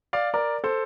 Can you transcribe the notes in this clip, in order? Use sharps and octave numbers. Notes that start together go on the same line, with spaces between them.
D5 F5
A#4 D5
A4 C5